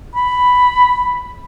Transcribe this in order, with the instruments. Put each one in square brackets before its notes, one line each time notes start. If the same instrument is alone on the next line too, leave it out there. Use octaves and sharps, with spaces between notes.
[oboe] B5